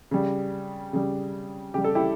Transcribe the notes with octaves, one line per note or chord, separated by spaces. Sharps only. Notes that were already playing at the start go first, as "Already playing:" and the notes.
C#3 G3
C#3 G3
C#3 G3 G4
A4
E4 G4